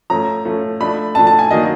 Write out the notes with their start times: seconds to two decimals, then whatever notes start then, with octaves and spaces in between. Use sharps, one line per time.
0.10 F3 A3 C#4 A#5
0.45 F3 A3 C#4
0.80 F3 A3 D4 B5
1.15 F3 A3 D4 A5
1.27 A5
1.39 G#5
1.51 D#3 F#3 A#3 D4 D#5